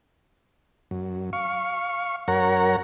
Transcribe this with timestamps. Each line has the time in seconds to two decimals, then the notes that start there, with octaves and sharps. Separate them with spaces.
0.91 F#2
1.33 F5 C#6
2.28 F#2 A#4 C#5 F#5 A#5